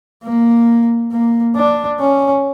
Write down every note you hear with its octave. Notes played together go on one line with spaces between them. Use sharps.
A#3
A#3
D4
C#4